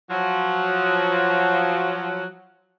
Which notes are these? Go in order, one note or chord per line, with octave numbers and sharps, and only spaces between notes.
F3 F#3